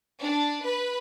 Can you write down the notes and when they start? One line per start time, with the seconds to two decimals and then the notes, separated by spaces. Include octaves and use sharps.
0.20 D4
0.63 B4